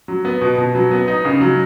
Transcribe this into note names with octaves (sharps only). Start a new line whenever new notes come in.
F#3
B3
B2
B2
F#3
B3
D#4
C#3
F#3